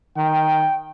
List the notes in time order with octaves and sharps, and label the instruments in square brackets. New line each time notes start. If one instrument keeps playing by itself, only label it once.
[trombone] D#3 [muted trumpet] G5